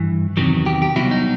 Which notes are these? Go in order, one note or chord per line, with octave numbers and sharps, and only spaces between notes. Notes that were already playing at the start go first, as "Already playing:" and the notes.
Already playing: G2 E3
E2 C3 D#3 F#3
G4
G4
C2 B2 F#3 E4
D#4